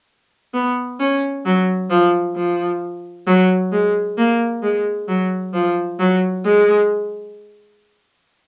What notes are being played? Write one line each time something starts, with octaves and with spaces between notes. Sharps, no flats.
B3
C#4
F#3
F3
F3
F#3
G#3
A#3
G#3
F#3
F3
F#3
G#3